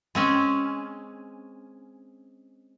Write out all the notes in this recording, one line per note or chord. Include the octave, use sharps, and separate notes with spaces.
G#3 C4 C#4